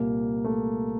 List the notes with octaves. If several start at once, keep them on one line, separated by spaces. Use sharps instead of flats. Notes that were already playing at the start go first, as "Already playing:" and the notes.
Already playing: C2 A#2 A#3
A3